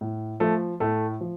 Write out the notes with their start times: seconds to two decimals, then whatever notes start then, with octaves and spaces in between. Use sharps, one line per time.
0.01 A2
0.40 F3 A3
0.80 A2 A3
1.21 F3